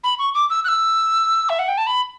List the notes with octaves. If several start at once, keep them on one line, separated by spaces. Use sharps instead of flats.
B5
C#6
D6
E6
F#6
E6
E5
F#5
G5
A5
B5